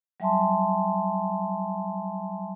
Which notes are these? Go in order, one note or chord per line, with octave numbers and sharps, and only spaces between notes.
F#3 G3 E5 G#5 A5 C6